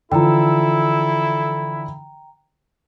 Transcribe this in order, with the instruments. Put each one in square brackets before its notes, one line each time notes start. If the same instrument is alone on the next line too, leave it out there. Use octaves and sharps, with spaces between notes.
[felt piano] D3 E3 F3 [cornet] E4 [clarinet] A4 [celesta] G5 A#5